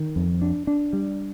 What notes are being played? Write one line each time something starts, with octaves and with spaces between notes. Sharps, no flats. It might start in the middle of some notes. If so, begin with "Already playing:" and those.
Already playing: D#3
F2
D4
D4
G3